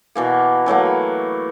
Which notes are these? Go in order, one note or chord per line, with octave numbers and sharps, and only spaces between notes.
B2 E3 A#3
E3 F#3 A3 A#3